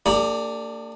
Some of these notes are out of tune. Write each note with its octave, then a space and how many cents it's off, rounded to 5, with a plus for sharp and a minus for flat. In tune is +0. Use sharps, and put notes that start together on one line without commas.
A#3 -40 D4 +0 G4 +40